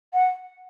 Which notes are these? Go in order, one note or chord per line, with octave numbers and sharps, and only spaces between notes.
F#5